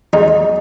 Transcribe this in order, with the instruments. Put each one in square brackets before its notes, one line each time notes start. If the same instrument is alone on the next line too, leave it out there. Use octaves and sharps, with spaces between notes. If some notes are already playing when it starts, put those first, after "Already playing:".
[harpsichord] E2 D#4